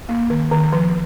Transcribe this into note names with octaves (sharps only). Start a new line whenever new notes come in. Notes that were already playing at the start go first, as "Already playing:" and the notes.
A#3
D#3
D#3
F3